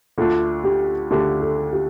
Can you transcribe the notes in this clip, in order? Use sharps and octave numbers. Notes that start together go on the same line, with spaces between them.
D2 D3 A3 D4 F4
G4
D2 D3 A3 D4 G4
A4
G4